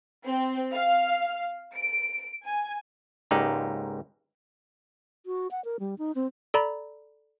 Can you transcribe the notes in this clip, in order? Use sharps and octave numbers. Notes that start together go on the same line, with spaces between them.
C4
F5
D7
G#5
C#2 G#2 A#3 D#4 G4 D5
F#4
F#5
A#4
G3
D#4
C4
A4 D5 A#5 B5